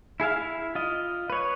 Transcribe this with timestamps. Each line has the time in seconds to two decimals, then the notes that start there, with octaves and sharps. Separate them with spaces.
0.20 E4 G#4 E5 F5
0.38 E4
0.75 F4 D#5
1.30 B4 C#5